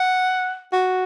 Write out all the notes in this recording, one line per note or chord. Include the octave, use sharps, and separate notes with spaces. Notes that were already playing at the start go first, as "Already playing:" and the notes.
Already playing: F#5
F#4